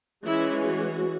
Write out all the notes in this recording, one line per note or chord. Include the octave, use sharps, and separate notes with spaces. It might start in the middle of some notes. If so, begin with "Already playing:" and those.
E3 G#3 C#4 E4
F#4